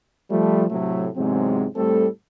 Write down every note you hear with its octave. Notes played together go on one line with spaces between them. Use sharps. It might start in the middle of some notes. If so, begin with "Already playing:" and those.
F3 G3 A3
A2 C3 F#3 A3
E2 G#2 C3 F#3 G#3 C4
A2 G3 A3 C4 A4